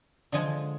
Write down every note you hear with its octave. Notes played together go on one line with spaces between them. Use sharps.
D3 F3 G#3